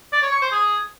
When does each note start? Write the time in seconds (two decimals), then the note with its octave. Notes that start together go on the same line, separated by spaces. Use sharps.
0.12 D5
0.22 C#5
0.32 C#6
0.42 C5
0.52 G#4